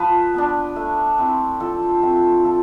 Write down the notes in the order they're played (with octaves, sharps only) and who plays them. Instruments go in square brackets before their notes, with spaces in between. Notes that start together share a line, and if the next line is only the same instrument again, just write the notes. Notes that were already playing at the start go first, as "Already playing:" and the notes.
Already playing: [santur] F3 B4
B3 D4
A3
C4 E4
F3 A4
A3 C4 F4
F3 A4